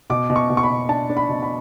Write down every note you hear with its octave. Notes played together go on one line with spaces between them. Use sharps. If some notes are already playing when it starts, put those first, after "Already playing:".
B2 D6
B2
C#6
B2
C#6
B5
B2
D4 A5
D4
B5
B2
B5